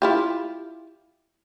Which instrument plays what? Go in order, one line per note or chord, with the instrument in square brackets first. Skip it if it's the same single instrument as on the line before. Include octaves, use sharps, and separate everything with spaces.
[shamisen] E4 F4 G4